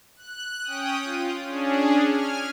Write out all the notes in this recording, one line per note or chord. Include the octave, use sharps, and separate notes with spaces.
F#6
C#4 G5 D#6
F4
C#4 D4 G#4
G#5 F6